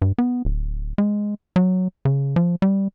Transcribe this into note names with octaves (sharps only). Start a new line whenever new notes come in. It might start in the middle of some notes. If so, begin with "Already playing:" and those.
G2
B3
D1
G#3
F#3
C#3
F3
G3